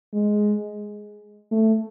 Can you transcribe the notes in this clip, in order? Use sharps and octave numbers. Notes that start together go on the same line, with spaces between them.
G#3
A3